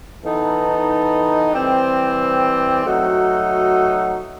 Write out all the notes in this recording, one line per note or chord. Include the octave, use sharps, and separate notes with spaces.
E3 B3 D#4 A4
E3 G3 C4
F#3 A3 D#4 F#4